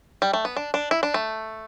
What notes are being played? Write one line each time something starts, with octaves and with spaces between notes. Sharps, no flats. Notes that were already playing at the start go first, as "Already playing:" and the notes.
G3
A3
B3
D4
D4
E4
D4
A3